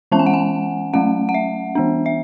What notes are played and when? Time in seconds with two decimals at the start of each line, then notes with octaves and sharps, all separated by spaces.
0.12 E3 G#3 C#4 A5
0.19 G#5
0.26 F#5
0.34 G#5
0.93 F#3 A3 C#4 F#5
1.29 F#5
1.34 E5
1.75 E3 B3 D4
2.06 E5